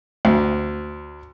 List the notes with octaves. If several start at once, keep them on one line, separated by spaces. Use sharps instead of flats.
D2